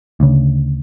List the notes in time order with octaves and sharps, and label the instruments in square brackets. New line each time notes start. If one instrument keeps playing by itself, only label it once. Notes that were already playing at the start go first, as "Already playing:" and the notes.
[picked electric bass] D2 C#3